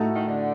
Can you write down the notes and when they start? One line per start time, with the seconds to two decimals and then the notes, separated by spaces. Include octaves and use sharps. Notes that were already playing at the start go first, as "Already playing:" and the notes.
Already playing: A2 A3 D#4 F#4 A4
0.15 D#3
0.27 D3